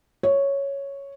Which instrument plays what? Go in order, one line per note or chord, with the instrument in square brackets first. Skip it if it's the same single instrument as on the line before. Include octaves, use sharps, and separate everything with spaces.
[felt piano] C#5